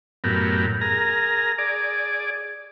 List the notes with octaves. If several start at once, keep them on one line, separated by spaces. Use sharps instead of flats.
F#2 A2 B3 G4 A#4
G#4 A#4 A#5
G#4 D5